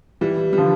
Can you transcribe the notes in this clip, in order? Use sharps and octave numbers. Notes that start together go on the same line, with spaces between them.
E3 G3
G3
D3 F3